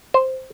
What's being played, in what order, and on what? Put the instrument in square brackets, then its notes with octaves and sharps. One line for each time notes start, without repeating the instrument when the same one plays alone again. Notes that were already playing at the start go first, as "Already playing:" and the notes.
[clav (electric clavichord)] C5